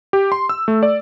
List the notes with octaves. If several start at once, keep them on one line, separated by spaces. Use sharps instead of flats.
G4
C6
E6
A3
D5